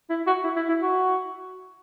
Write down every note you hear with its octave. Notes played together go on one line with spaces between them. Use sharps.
E4
F#4
E4
E4
E4
F#4